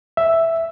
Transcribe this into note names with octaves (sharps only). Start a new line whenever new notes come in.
E5